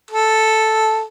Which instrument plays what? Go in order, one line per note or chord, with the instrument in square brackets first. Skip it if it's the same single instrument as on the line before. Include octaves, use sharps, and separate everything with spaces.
[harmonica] A4